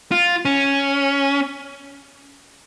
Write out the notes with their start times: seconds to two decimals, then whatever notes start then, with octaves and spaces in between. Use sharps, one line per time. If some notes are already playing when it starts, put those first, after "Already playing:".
0.11 F4
0.45 C#4